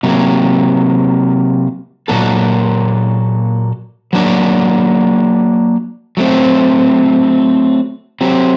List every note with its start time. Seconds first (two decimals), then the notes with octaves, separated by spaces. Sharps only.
0.03 C3 F#3 A#3
2.08 A#2 F#3 A#3 F#4 A4
4.13 F#3 A#3 D4
6.17 F#3 A3 C4
8.21 F#3 C4 G4